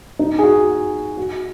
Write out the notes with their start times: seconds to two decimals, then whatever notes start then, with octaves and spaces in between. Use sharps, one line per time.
0.19 D#4
0.39 G#4
0.43 F#4
1.17 F#4